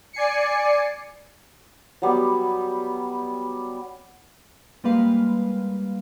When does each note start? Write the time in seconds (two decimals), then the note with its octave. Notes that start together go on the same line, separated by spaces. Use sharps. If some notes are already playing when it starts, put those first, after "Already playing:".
0.13 D5 G#5 C7 C#7
2.02 F#3 G3 B3
4.84 G3 G#3 A#3 B4 F5